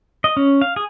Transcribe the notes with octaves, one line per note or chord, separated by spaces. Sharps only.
D#5
C#4
F5
G#4